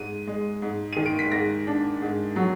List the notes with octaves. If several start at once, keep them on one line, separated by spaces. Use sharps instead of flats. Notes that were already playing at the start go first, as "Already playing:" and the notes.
Already playing: G#2 D#7
G#3
G#2
D#3 D#7
D7
B6
G#2 A#6
D4
G#2
F#3